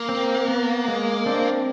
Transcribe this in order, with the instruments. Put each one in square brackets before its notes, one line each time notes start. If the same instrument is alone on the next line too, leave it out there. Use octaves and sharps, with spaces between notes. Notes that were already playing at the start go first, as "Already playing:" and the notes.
Already playing: [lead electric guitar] A#3
[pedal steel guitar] C4
B3
G#3
C4 D4